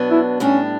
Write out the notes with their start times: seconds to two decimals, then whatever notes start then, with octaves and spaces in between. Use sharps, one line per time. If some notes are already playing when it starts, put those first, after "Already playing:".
Already playing: B2 F#3 B3 D4
0.11 E4
0.40 A2 G3 C#4 D4